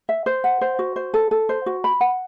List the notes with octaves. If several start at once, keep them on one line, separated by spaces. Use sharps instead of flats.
E5
C5
F#5
C5
F#4
C5
A4
A4
C5
F#4
B5
F#5